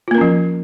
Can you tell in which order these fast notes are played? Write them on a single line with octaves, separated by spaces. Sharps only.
F4 A#3 A#4 C#4 F3